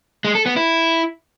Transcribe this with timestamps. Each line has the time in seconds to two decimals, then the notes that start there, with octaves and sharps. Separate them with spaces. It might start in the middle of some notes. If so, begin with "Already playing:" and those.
0.25 G#3
0.35 A4
0.46 B3
0.56 E4